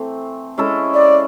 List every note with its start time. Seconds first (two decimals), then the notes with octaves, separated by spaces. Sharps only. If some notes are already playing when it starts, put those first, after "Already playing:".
Already playing: E3 A3 C4
0.58 G#3 C#4 E4 A4
0.94 D5